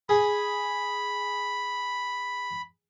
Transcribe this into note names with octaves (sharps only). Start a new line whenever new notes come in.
G#4 B5